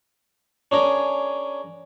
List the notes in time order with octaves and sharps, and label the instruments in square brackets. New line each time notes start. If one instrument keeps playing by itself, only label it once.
[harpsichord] C#4 D4 G#4 A#4